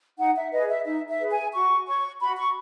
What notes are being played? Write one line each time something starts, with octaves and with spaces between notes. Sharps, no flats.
D#4 F#5
E5
G#4 B4 D#5
E5
D#4 E5
E5
G#4 B4
G#5
F#4 C#6
C#5 C#6
F#4 B5
C#6